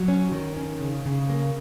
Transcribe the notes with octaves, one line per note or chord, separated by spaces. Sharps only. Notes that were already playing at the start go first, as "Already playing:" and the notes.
Already playing: F#3
C#4
D#3
C#4
C#3
C#3
A#3